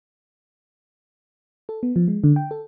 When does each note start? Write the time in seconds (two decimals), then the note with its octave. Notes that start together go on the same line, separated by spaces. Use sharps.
1.69 A4
1.83 B3
1.96 F3
2.08 G#3
2.24 D3
2.36 G5
2.51 A4